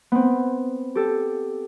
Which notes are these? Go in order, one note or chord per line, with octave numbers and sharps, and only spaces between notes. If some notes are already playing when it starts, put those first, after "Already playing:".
B3 C4
G4 A4